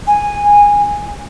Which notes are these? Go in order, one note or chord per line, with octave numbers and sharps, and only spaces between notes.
G#5